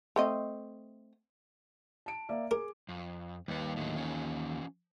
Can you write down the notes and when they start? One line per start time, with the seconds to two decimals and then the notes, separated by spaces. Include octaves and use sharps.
0.16 A3 C4 D#5
2.06 A5 D7
2.29 A#3 D5 E5
2.51 G#4 A#4 D6
2.89 F2
3.48 D#2 G3 B4
3.76 A2 D3 F#3
3.95 E3 F3 C#4